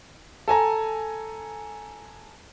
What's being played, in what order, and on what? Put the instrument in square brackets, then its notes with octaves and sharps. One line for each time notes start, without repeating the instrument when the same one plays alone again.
[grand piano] A4 G#5 A#5